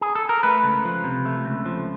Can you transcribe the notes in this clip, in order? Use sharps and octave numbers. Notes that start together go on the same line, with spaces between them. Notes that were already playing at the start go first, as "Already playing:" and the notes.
G#4
A4
A#4
A3 B4
C#2
F3
C3
A3
C#2
F3